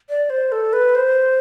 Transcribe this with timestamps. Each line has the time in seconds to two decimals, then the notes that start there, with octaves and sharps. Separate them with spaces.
0.09 D5
0.30 C5
0.52 A4
0.73 B4
0.95 C5